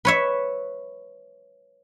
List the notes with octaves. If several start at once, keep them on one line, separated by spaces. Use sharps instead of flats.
B4 C#5 E5